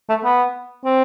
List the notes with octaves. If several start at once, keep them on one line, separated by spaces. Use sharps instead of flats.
A3
B3
C4